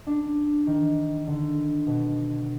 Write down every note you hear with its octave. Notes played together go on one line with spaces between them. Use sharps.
D4
D#3
D3
B2